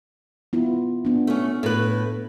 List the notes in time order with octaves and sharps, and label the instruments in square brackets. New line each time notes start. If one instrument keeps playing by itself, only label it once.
[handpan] B3 E4 F4
B3 D4
[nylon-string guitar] A3 C#4
A2 B4